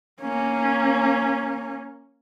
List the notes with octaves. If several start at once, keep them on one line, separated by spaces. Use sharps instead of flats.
A#3 C#4